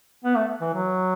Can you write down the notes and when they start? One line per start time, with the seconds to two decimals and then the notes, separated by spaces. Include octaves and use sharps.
0.24 B3
0.36 A3
0.61 E3
0.74 F#3